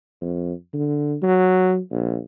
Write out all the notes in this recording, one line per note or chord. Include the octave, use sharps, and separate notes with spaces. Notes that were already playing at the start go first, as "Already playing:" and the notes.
F2
D3
F#3
A#1